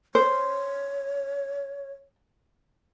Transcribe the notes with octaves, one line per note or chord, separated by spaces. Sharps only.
C5 C#5